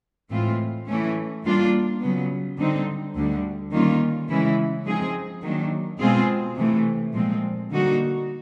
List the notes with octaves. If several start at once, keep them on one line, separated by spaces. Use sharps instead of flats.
A2 E3 G#3 C4 F4
E3 A3 C#4
G3 A#3 D4 F4
C#3 F#3 B3
D3 G3 C4 D#4
D2 D3 G3
D#3 G3 A#3 C#4 F4
C#3 E3 G#3 C#4 E4
F3 G#3 C4 D#4 G#4
D#3 F#3 A#3 D4
B2 G#3 C4 F4 G#4
C3 E3 A3
A#2 F3 G#3 C4
D3 G3 A#3 D#4 F#4